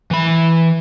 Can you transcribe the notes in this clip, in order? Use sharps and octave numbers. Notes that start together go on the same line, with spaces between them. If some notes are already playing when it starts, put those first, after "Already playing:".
E3 B5